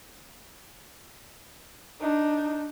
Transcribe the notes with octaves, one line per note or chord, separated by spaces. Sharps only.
D4 D#4